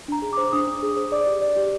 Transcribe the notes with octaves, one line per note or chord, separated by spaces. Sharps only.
D4 A#5
G#4
C5 D6
D4 D#6
D4
G#4
C5
D5 D6
G4
D5
G4